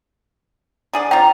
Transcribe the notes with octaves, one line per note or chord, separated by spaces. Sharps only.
D3 G#4 D5
C4 F4 G5 A#5